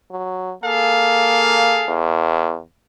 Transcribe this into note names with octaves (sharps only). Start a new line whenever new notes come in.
F#3
A#3 G#4 A4 F5
E2